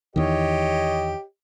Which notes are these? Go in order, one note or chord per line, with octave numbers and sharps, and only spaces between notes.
E2 D#3 G4 C#5 D#5